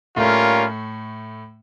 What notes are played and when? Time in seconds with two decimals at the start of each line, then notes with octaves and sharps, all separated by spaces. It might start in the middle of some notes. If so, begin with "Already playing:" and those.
0.16 A2 G3 A3 A#3 C#4 F4 A#4